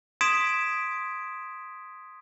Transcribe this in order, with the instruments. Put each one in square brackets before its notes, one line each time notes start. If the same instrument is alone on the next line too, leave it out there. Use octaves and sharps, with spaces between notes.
[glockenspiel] C6 D#6 G#6 B6 D7 E7